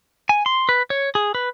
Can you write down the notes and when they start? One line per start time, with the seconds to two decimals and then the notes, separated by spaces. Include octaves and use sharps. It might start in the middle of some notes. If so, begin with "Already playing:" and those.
0.29 G#5
0.46 C6
0.69 B4
0.90 C#5
1.15 G#4
1.35 B4